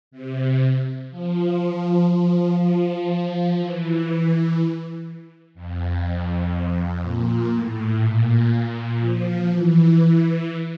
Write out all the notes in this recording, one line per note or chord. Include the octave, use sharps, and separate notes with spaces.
C3
F3
F3
F3
E3
F2
A#2
A2
A#2
F3
E3